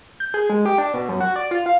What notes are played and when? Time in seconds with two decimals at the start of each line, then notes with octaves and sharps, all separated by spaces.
0.20 G6
0.34 G#4
0.50 G#3
0.65 G4
0.78 D4
0.94 B2
1.09 F#2
1.20 F#4
1.36 D5
1.51 F4
1.66 F5